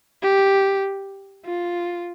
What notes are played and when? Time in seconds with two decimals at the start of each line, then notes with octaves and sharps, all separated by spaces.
0.23 G4
1.45 F4